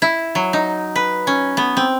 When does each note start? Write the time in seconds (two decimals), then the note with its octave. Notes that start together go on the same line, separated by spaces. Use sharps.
0.02 E4
0.35 F#3
0.53 D#4
0.96 B4
1.27 C#4
1.57 B3
1.77 C4